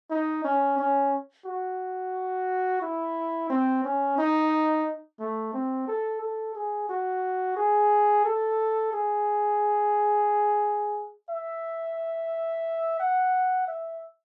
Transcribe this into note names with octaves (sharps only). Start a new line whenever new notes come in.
D#4
C#4
C#4
F#4
E4
C4
C#4
D#4
A3
C4
A4
A4
G#4
F#4
G#4
A4
G#4
E5
F#5
E5